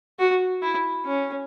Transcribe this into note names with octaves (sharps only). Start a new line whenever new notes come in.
F#4
E4
C#4